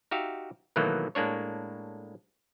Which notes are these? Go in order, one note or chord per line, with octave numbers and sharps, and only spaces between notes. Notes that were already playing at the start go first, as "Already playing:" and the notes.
D#4 F#4 G4 E5 F5
B2 D#3 E3 F#3 A3 A#3
A2 G#3 A#3 D4 C#5